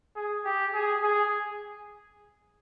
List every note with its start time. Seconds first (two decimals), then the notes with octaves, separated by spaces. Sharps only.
0.16 G#4
0.45 G4
0.74 G#4
1.03 G#4